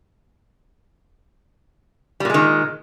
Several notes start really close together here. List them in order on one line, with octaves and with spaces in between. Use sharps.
G3 A#2 G#3 D#3